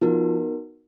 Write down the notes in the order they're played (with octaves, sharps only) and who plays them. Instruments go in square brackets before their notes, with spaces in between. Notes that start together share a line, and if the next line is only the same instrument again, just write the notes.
[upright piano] F3 [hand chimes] B3 D#4 F#4 A#4